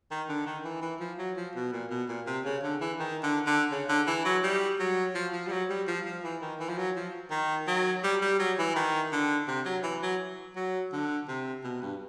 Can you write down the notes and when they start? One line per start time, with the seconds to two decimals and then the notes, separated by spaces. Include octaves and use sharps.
0.11 D#3
0.29 D3
0.46 D#3
0.65 E3
0.82 E3
1.00 F3
1.19 F#3
1.37 F3
1.55 B2
1.72 A#2
1.90 B2
2.08 A#2
2.27 C3
2.45 C#3
2.63 D3
2.80 E3
2.99 D#3
3.23 D3
3.47 D3
3.71 C#3
3.89 D3
4.08 E3
4.25 F#3
4.43 G3
4.80 F#3
5.15 F3
5.33 F3
5.47 G3
5.52 F#3
5.70 G3
5.87 F3
6.06 F3
6.24 E3
6.42 D#3
6.60 E3
6.69 F3
6.78 F#3
6.96 F3
7.31 D#3
7.68 F#3
8.04 G3
8.22 G3
8.39 F#3
8.58 E3
8.76 D#3
9.12 D3
9.48 C3
9.65 F#3
9.83 E3
10.03 F#3
10.56 F#3
10.93 D3
11.28 C3
11.64 B2
11.82 G2